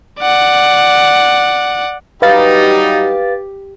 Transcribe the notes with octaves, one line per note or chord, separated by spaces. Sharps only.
D5 F#5
F#3 G3 D#4 G4 B4 F5 A6